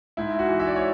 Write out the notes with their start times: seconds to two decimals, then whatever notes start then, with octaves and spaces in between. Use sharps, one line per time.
0.17 G#2 E4
0.39 F#4
0.49 E3
0.60 E5
0.67 D5
0.76 C#5